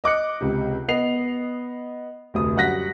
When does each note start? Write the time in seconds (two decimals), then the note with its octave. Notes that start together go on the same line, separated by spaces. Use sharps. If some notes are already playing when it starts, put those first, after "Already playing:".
0.04 D#5 D6 F#6 C#7
0.41 C#2 C3
0.88 B3 D#5 C7 F7
2.34 F1 D2 D#6
2.56 F#2 G3 F#5 F#6 A#6 B6